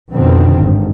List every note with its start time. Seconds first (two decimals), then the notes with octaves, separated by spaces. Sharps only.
0.12 F2 B2 D3 D#3 C4
0.61 G#1 G2